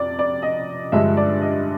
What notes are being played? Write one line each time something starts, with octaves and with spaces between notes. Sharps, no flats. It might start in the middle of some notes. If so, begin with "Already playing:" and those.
Already playing: F2 C3 D5
D5
D#5
G2 D3 F3 G#3 E5
D5
D#5